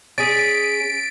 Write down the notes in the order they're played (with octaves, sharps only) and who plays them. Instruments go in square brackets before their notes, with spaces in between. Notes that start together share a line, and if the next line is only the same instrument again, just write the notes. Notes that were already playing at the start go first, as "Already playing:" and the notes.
[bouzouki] C#4 G#4 [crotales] A6 B6 [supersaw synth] D7